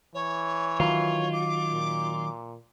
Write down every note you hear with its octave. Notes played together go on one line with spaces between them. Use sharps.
E3 C#5
D#3 F#3 F4
D6
A#2